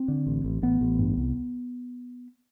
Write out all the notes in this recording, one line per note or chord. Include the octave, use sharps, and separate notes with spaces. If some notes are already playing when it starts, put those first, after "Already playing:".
Already playing: C4
D3
A1
A1
A1 B3
A1
G2
C2